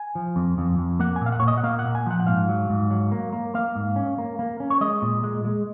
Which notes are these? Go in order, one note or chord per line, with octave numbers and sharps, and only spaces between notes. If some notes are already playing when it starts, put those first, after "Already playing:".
Already playing: G#5
F3
F2
F2
F2
A#3 F#5
G#5
A#2 F5
F#5
A#2 C#5
D#5
F#5
A#3 F5
F#5
A#2
G#5
F3 F#5
F#5
G#2 F5
F#3
G#2
F#3
A#3
A#3
A#3 F5
G#2
C#4
A#3
A#3
C#4
C#5
G#3 D#5
A#2
G#3
G#3